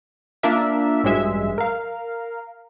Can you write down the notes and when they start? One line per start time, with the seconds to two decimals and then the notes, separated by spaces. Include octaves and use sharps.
0.43 A#3 D4 F4 A#4 E5
1.04 A1 G2 F#3 G#3 E5
1.58 A#4 F5